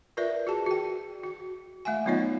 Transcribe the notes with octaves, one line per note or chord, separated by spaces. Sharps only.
F4 A#4 B4 D5 E5
F#4 G#4 A5
F#4 G5
F#4
A3 E5 F#5 G#5
F#3 B3 D#4 F4 C#5 D#5